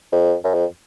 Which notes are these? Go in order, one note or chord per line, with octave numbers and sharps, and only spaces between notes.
F2
F#2
F2